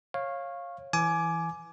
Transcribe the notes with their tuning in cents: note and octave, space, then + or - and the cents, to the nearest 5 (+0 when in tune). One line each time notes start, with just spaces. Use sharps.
C#5 -20 F5 +0
E3 +0 G#5 +20 D6 +0